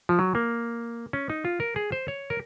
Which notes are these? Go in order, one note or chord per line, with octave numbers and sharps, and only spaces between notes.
F3
F#3
A#3
C#4
D#4
F4
A#4
G#4
C5
C#5
A#4